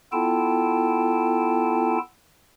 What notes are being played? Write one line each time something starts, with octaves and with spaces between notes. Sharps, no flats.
B3 E4 F4 A4 G5 A5